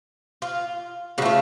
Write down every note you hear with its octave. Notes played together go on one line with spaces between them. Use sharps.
F4
C#3 A3 F4 F#4